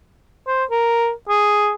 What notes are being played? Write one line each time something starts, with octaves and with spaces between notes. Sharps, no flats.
C5
A#4
G#4